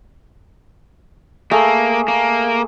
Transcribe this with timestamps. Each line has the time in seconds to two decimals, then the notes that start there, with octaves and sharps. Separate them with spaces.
1.51 A3 A#3 G#4
2.08 A#3